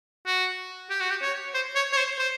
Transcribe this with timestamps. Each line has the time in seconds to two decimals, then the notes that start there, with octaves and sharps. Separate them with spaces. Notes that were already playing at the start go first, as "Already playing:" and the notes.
0.26 F#4
0.90 G4
1.00 F#4
1.10 G4
1.22 C#5
1.54 C5
1.75 C#5
1.93 C#5
1.97 C5
2.18 C5